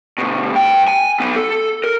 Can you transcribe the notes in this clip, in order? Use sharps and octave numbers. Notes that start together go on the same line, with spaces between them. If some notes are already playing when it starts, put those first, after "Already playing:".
D2 B2
G2 G5
G#5
F#3 B3
A4
A#4